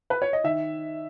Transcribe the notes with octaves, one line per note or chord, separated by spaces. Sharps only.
B4
C#5
D#5
D#3 E5